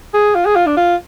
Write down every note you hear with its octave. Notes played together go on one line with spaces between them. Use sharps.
G#4
F4
G#4
F4
D4
F4